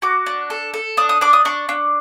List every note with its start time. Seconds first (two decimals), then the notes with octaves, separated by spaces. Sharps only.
0.02 F#4 D6
0.26 D4
0.50 A4
0.74 A4
0.97 D4 D#6
1.09 D#6
1.21 D4 D6
1.33 D#6
1.45 D4 C#6
1.69 D4